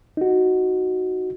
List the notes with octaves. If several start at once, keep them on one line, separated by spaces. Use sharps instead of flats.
D#4 F#4